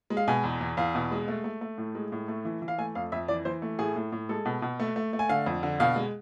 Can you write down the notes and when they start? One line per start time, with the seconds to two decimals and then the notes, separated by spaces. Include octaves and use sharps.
0.10 G#3
0.17 F5
0.28 B2 G#5
0.44 E2
0.61 E2
0.77 E2 F5
0.95 B2
1.11 G#3
1.28 A3
1.44 A3
1.61 A3
1.78 A2
1.95 G#3
2.12 A2
2.28 A3
2.45 E3
2.62 E3
2.68 F5
2.78 A3 G#5
2.95 F2 F5
3.12 F2 E5
3.28 E3 D5
3.45 E3 C5
3.62 A3
3.79 A2 G#4
3.96 A2
4.12 A2
4.29 G#3 A4
4.46 B2
4.62 B2
4.80 A3
4.96 A3
5.13 A3
5.19 G#5
5.29 D3 F5
5.46 F2
5.63 D3
5.80 B2 F5
5.96 G#3